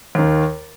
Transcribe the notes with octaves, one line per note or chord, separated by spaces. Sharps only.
D#2 D#3